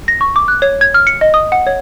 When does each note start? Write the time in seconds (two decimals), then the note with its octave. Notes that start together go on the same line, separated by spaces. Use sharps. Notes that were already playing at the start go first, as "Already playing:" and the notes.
0.08 A#6
0.21 C#6
0.36 D6
0.48 F#6
0.62 C#5
0.81 G#6
0.94 F6
1.07 C#7
1.21 D#5
1.34 D#6
1.52 F#5
1.67 C#5